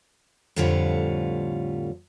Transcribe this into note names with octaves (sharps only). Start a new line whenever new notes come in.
F2 A2 D3 G3 F4 C#5